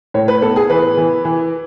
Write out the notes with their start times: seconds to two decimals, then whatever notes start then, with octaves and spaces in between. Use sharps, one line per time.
0.14 A2 C#5
0.28 B4
0.42 B3 A4
0.56 G#4
0.70 E3 B4
0.97 E3
1.25 E3